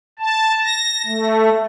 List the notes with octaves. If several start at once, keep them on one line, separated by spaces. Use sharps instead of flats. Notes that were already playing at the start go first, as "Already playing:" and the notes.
A5
A#6
A3